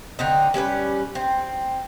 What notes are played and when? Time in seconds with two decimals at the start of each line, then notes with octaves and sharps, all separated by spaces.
0.19 D3 C4 D#4
0.54 G3 C#4 D#4 B4
1.15 C4